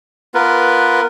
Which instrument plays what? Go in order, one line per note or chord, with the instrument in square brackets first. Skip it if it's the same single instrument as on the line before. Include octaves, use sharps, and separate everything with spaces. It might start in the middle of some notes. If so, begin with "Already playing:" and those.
[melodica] B3 F4 A#4 B4